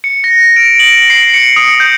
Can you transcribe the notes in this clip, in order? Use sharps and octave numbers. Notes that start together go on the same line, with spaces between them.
C#7
A#6
D7
F#7
C7
C#7
D#6
G6